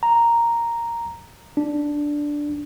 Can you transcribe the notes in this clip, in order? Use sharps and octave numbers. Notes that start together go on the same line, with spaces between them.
A#5
D4